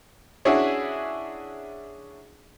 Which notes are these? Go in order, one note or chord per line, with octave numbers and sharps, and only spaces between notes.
C#4 D4 E4 F#4 G#4